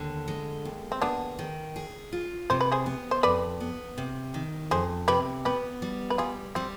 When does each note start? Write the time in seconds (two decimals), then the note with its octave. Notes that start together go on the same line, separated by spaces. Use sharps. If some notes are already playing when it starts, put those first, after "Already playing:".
Already playing: D#2 D3
0.28 G#3
0.65 D#2
0.92 C4
1.01 B3 D4 G#4
1.39 D#3
1.76 G#4
2.12 F4
2.50 C3 C5
2.61 B4
2.72 G#4 C5
2.86 B3
3.11 C5
3.23 F2 B4 D5
3.60 B3
3.98 C3
4.34 D#3
4.71 F2 G#4 C5
5.08 C3 G4 B4
5.45 B3 G4 B4
5.82 G3
6.10 B4
6.18 G3 F4 G#4
6.55 G3 C4